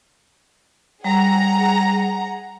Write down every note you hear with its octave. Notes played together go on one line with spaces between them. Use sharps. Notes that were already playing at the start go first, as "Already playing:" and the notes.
G3 G#4 F#5 A#5